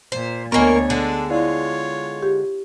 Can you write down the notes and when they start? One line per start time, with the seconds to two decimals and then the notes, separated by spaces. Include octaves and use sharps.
0.12 A#2 C5
0.52 D2 A#3 B3 A#4 C#5 D#5 G#5 C#6
0.90 D3 G#3 D4 G#4 A4
1.30 E4 F4 C#5 D5 F5
2.22 G4